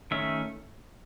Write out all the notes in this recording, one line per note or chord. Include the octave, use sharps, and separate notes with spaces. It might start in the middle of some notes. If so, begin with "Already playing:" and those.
D#3 A3 C#4 E5